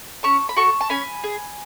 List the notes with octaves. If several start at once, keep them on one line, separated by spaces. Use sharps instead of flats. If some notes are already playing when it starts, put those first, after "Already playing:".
C#4 A5 C#6
B5
F#4 A4 A5 C#6
A5
C#4 G#5 B5
G#4